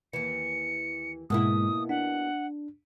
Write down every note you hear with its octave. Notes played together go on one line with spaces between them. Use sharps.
D#2 E3 C#7
G#2 B2 G#3 A#3 E4 D#6
D4 F#5